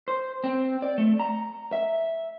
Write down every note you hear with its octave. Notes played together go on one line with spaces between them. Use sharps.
C5
C4
D5
A3
A#5
E5